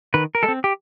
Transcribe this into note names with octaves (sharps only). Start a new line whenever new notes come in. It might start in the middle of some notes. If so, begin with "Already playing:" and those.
D#3 B4
A#4
G#3 A4
C4
G4